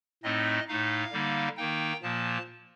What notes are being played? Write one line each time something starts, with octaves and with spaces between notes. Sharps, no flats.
A2 A3 C4 D#4 D#5
A2 A3 D#4 F5
D3 G3 A#3 D#4
D#3 A#3 D#4 G5
A#2 F3 A#3 A5